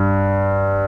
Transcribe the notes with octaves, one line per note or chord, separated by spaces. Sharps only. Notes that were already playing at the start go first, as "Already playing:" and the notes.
Already playing: G2